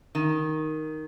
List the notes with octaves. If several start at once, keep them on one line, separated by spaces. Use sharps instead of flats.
D#3